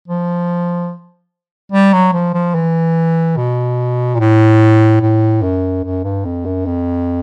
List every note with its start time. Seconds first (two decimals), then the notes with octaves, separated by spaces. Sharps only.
0.08 F3
1.72 G3
1.93 F#3
2.13 F3
2.34 F3
2.55 E3
3.36 B2
4.15 A#2
4.19 A2
5.01 A2
5.43 F#2
5.84 F#2
6.03 G2
6.24 F2
6.45 F#2
6.66 F2